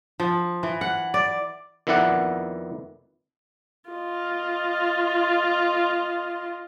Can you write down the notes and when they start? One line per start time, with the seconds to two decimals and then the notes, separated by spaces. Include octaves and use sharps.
0.20 F3
0.63 E3
0.81 F#5
1.14 D5
1.87 F2 D#3 B3 E4 D5 F#5
3.90 F4 D#5